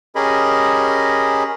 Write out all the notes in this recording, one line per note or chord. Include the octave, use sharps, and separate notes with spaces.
C#4 G4 G#4 A#4 D#5 B5